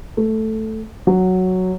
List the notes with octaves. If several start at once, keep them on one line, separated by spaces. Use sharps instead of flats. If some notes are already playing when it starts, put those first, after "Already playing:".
A3
F#3